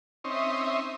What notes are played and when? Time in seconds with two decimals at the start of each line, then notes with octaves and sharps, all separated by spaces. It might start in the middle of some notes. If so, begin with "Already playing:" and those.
0.24 C4 C#4 D#4 E5 D#6